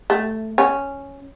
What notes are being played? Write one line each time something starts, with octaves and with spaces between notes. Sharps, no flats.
A3
C#4